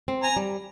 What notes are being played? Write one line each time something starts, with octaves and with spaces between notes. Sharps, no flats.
C4
G#5 A#5
G3